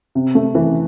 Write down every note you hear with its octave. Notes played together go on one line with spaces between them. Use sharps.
C3
A3
E3